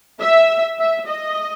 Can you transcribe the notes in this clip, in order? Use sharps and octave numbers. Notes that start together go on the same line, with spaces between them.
E5
E5
D#5